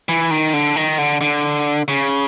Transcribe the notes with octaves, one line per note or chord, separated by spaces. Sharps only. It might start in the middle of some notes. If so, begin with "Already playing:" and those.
E3
D#3
D3
D#3
D3
D3
C#3